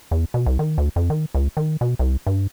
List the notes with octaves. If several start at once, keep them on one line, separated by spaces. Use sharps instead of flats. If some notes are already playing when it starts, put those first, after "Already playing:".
E2
B2
C2
D#3
D2
F2
D#3
C#2
D#3
B2
C2
G2